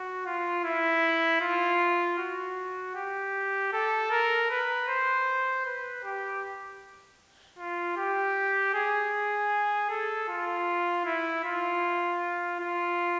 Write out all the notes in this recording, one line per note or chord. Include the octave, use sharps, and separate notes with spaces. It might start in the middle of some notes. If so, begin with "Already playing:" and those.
Already playing: F#4
F4
E4
F4
F#4
G4
A4
A#4
B4
C5
B4
G4
F4
G4
G#4
A4
F4
E4
F4
F4